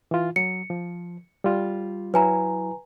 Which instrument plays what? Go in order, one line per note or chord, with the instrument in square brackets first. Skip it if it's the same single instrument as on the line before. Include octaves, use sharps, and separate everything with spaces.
[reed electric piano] E3 F4
[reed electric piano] F#3 [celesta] C#7
[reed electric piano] F3
G3 F4
[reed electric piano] F#3 E4 [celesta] B4 G#5 A#5